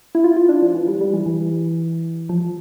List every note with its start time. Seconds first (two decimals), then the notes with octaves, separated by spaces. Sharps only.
0.15 E4
0.24 F4
0.36 F4
0.49 D4
0.62 F3
0.75 E3
0.88 G3
1.01 G3
1.13 E3
1.26 E3
2.29 F3